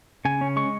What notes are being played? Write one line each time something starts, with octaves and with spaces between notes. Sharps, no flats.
C#3 G#5
C#4
G#3 C#6